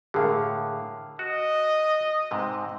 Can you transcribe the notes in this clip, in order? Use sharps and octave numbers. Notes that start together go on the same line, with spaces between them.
A2 D3 G#4 A#4 F5
F#4 D#5
G#2 C3